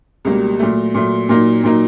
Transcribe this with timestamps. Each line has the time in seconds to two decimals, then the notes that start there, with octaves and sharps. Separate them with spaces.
0.25 C#2 B2 G3 A#3
0.59 A#2 F#3 A3
0.94 A#2 F#3 A3
1.29 A#2 F#3 A#3 D#4
1.64 A#2 F#3 A#3 D#4